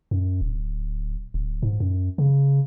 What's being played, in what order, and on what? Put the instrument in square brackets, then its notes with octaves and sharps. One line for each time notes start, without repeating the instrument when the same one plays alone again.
[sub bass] F#2
D1
D1
G#2
F#2
C#3